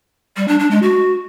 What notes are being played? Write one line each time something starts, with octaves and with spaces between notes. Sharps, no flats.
G3
D4
D4
G#3
F#4